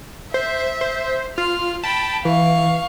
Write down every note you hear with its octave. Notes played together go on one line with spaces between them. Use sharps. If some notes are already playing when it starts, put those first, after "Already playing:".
C5 E5
C5
F4 F6
G5 A5 B5
E3 F5 C#6